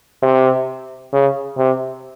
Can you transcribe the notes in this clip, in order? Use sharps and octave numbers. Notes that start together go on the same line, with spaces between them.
C3
C#3
C3